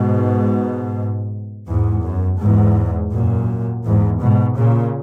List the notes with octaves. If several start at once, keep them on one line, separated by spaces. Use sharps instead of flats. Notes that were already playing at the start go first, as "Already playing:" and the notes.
Already playing: G#2 B2
E2 G#2
F#2
E2 G#2
F#2 A#2
E2 G#2
G#2 B2
A#2 C#3